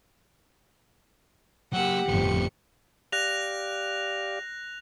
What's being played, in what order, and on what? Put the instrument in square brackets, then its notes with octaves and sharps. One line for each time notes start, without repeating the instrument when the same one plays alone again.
[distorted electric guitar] F#3 A#3 [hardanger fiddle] G4 [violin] F#5 E6
[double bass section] G1 F2 F3 [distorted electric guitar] A2 B3 [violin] C#7
[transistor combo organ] G4 D5 F5 [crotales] F#6 A#6 F7